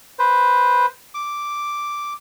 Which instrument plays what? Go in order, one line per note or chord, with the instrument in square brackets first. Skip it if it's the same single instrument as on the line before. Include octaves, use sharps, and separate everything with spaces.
[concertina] B4 C5
D6